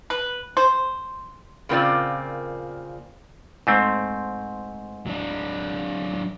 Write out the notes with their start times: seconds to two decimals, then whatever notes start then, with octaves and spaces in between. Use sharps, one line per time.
0.10 B4
0.57 C5
1.69 A#2 C#3 A#3 C4 F4 D5
3.67 G#2 A3 C4
5.07 F#3 D4